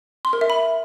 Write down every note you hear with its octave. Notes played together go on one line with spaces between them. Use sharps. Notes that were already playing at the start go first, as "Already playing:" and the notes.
C6
A#4
E5
B5